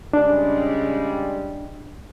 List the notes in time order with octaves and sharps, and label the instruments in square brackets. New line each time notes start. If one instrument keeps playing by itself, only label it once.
[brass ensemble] C#3 G3 G#3 [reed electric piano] D4